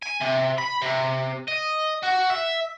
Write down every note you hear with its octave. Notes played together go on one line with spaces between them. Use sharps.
G#5
C3
B5
C3
D#5
F#4
E5